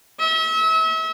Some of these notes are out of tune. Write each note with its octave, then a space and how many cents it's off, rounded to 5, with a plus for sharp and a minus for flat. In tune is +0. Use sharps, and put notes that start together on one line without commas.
E5 -35